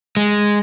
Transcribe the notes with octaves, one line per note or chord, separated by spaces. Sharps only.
G#3